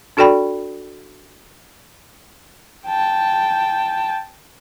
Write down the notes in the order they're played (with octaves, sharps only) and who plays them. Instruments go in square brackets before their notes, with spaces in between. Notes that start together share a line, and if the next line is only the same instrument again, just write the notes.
[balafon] D4 F#4 A4 D5 G5 B5
[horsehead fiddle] G5 A5